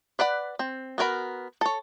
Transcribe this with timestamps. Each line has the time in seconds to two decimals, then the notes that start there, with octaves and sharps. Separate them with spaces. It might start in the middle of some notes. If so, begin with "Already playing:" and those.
0.19 B4 D5 F#5 B5
0.59 C4
0.98 B3 F#4 A#4 B5
1.61 A4 C#5